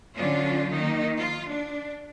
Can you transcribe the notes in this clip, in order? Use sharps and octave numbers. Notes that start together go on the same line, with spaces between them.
D3 F#3 C#4 D4 F4
D#3 A#3 D#4
F4
D4